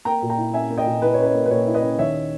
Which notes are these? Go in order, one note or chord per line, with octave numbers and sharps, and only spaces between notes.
A#3 G5 A#5
A#2
G5 A#5
E4
C#4 E5 G#5
A#3
D#5 G5
A#2
E4 B4
C#5
C#4 B4
C#5
A#3
B4
A#2 C#5
E4
B4 D#5
C#4
D#2 C#5 E5